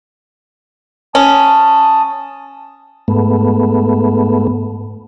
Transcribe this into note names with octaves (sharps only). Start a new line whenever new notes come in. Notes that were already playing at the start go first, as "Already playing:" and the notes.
C#4 A5 D#6
G#2 A3 B3